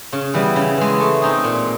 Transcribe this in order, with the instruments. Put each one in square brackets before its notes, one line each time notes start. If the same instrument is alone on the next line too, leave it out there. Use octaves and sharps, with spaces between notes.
[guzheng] C#3
E3 G3 B3
C#3
E3 G#3
A3
C4 D#4 G#4
A#2